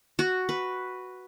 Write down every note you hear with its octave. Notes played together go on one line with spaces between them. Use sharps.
F#4
B4